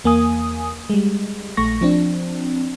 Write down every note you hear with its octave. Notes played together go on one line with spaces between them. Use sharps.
E2 A#3 G#5 D#6
G3 G#3
A#1 A3 C#6 A#6
F3 C4 D4